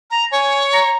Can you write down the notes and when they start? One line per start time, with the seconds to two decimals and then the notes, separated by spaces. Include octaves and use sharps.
0.11 A#5
0.32 C#5 G#5
0.74 A#5